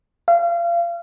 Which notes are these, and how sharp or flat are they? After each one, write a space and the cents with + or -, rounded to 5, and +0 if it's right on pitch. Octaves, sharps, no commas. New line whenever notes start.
F5 -30